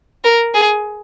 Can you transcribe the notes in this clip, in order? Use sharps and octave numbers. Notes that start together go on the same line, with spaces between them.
A#4
G#4